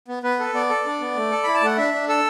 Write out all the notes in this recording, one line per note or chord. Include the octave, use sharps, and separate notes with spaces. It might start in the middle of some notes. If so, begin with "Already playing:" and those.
B3
B3 B4
A4
B3 D5
A4
D4
B3
A3
A4
E4 B5
A5
A3 F#5
D4 E5
D4
A4 E6